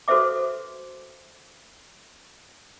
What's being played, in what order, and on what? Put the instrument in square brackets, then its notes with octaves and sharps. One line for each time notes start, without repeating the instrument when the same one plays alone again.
[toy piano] F#4 A4 B4 C5 E5 D6